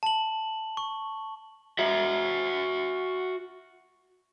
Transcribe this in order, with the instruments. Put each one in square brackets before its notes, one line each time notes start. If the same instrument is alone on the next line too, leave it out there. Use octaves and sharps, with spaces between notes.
[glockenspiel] A5 F#7
C#6
[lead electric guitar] F#4 E5